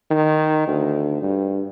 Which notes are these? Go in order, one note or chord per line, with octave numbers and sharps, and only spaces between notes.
D#3
D2
G2